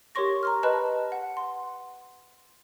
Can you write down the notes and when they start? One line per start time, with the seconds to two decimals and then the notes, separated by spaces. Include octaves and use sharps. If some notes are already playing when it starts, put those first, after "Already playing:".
0.15 G4 A#4 C#5 C6 C#6 A#6
0.43 A#5 C6 F6
0.63 B4 D#5 A5 B5 F#6
1.12 F#5
1.37 C6